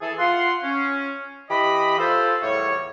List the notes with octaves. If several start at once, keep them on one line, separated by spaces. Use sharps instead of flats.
E3 G#4 A4
F4 F#5 C6
C#4
E3 G4 D#5 B5
F4 A4 C5
E2 A2 G3 C#5